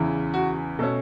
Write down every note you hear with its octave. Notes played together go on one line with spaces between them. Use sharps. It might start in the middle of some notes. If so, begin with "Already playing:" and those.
Already playing: E2 C#3 E3
F#4
B2 A3 C#4 A4